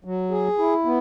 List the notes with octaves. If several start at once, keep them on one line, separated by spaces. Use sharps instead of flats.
F#3
G#4
E4
B3